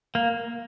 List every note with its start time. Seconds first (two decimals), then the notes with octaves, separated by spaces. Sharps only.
0.15 A#3